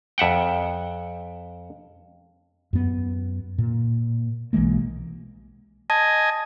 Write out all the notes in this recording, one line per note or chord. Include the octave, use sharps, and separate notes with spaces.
F2 E5 F#5 G5
F#2 B3
A#2
B1 E3 G#3 A#3
D#5 G#5 A5